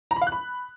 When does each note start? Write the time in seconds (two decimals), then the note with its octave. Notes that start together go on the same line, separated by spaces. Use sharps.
0.11 A#5
0.16 B5
0.21 F5
0.27 F#6
0.32 B5